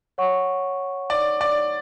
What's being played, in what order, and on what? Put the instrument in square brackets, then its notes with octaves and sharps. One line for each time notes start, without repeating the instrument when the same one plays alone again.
[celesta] C#5 F#5 C#6
[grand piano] D5
D5